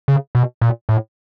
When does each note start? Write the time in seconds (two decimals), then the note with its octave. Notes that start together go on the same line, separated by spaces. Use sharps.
0.08 C#3
0.35 B2
0.62 A#2
0.89 A2